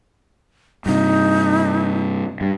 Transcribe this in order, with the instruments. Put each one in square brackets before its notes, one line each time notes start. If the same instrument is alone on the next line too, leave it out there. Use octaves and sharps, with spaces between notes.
[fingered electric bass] G2 C3 [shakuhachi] D#4
[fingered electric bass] G2